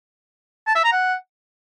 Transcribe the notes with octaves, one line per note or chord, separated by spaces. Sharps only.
A5
E5
A#5
F#5